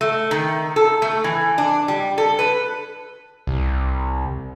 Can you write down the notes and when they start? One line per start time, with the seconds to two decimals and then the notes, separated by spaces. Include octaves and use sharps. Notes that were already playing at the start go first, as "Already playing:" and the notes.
0.01 A3
0.31 D#3
0.76 A4
1.02 A3
1.24 E3
1.58 D4
1.88 G3
2.18 A4
2.39 B4
3.47 C2